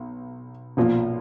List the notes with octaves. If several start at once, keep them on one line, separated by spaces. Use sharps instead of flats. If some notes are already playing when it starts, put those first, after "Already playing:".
Already playing: B1
B1 A#2 F3